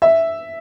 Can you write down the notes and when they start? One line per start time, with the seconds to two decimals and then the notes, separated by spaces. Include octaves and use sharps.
0.02 E5